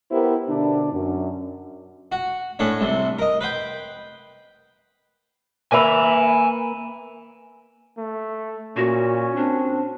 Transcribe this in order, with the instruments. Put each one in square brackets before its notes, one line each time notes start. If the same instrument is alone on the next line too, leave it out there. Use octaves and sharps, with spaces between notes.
[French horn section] B3 E4 G4 A#4 C5
B2 D3 D4
F#2
[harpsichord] F#4
A2 C#4 D4 C#5
C2 C3
A#4 D#5
B4 C5 G5
[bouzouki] A#3 B4 E5 [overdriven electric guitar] G#5 B5
[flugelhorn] A3
[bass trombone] A#2 [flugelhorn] C#4 [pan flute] F#4
[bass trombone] C4 [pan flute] D4